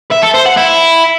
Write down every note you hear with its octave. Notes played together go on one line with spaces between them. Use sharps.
E5
A4
C5
F#5
E4